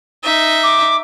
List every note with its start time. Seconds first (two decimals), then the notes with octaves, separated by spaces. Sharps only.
0.24 D#4 E5
0.63 D6